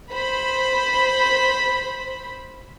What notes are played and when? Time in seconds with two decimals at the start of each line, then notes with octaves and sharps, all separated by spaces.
0.13 C5 B5